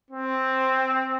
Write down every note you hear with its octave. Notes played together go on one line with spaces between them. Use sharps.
C4